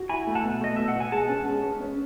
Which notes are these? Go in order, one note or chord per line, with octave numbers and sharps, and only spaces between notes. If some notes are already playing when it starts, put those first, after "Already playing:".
Already playing: F#4
E4 G#5 B5
A3
F#5 A5
B2
A3 D#5
B2 E5
F#5
B2 G#5
G#3 F#5 A5
C#4
G#3
C#4
C#4